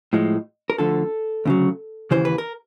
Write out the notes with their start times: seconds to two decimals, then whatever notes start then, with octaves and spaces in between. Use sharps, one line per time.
0.13 A2 F3 G#3
0.70 A#4
0.78 D2 D3 F3 A4
1.45 D2 C#3 F#3
2.11 D#2 C#3 E3 C5
2.25 B4
2.38 A#4